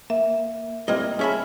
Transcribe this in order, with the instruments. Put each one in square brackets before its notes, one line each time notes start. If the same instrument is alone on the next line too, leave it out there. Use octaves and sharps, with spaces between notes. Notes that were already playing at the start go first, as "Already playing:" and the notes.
[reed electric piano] A#3 [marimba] E5
[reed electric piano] G3 C4 E4 [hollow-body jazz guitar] A#3 D#5
[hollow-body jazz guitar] C#4 E5 B5 [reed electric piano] G#4 C#5 A5